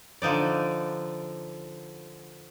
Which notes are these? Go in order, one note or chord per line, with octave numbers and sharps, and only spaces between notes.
D3 F3 D#4 D5